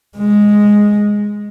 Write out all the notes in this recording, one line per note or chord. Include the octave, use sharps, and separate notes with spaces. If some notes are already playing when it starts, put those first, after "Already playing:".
G#3